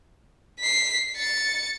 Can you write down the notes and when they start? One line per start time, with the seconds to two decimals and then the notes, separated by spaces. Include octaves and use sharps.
0.59 B6 C7
1.16 A6 C#7